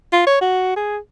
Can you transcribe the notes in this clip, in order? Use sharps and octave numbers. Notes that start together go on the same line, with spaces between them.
F4
C#5
F#4
G#4